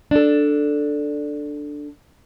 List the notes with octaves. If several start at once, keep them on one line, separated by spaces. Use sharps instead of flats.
D4 A4